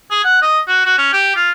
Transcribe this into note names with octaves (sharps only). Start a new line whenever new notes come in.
G#4
F#5
D#5
F#4
F#4
C#4
G4
F4